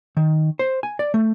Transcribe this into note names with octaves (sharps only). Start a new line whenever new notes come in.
D#3
C5
G#5
D5
A3